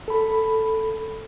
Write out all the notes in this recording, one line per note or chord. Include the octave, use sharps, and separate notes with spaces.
A4 B5